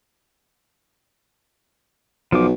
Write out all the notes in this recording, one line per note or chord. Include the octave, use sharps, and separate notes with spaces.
B1 F3 D6